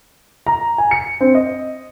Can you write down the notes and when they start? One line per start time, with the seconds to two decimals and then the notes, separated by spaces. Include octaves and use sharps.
0.47 A#5
0.78 G#5
0.91 C#7
1.21 C4
1.35 D#5